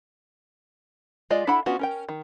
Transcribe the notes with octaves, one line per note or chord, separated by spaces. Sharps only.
G#3 F4 D5 D#5
D4 E4 A4 F#5 B5
B3 C#4 D4 F4 F#4
C#4 A#4 G5
D#3